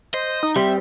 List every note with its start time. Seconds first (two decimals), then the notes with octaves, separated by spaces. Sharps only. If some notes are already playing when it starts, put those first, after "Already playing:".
0.14 C5 D#5
0.43 D#4
0.56 G3 C4 E5